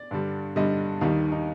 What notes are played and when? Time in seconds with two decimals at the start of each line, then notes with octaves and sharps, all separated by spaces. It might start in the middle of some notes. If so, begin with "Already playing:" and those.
Already playing: D5
0.11 G2 D3 G3
0.56 G2 D3 G3 D#5
1.01 D#2 D#3 G3 D#4
1.32 D#4